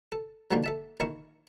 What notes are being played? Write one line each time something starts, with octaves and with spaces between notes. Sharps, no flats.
A4
B2 D3 D#3 F3 G3 A#3
A4 E5 A5
A#1 D#3 E4 A#4 C#6